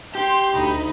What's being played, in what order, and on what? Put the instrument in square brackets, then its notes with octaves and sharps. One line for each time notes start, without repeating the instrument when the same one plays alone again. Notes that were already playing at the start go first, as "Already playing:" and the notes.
[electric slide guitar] G4 [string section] C6 G6
[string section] D2 D#4 B5